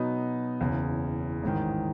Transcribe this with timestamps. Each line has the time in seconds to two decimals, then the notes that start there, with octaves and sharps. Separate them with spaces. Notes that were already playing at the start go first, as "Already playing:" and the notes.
Already playing: B2 F#3 B3 D#4
0.60 F#1 E2 C#3
1.43 A1 G#2 D#3